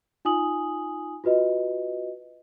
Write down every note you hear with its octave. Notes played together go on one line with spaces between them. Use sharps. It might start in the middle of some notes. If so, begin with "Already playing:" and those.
D#4 F4 G#5 D#6 F#7
F4 F#4 B4 D#5